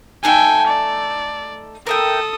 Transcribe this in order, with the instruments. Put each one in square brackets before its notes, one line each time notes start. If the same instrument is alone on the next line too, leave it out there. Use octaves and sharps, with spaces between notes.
[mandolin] A3 D#4 A4 [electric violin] G5 G#5
[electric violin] D5
[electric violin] A4 D#6 [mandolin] A#4 E5 G5